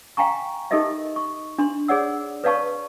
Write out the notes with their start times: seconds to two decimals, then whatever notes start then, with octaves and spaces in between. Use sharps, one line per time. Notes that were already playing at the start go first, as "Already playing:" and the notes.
0.17 F5 G5 G#5 A#5 C#6
0.71 D#4 G4 A4 A#4 D#5 E5
1.16 C#6
1.58 D4 C6
1.88 G#4 C#5 D5 F#5 E6
2.44 B4 C#5 D5 F5 A5 C#6